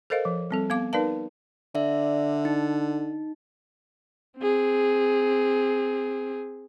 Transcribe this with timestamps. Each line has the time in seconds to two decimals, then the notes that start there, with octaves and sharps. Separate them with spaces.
0.10 A4 A#4 C5 D#5 F5
0.25 F3
0.51 G3 C4 A4
0.70 B3 F5 D6
0.93 D#4 A#4 B4 D5 F5 A5
1.75 D3 D5 E5
2.45 D#4
4.38 C4 G#4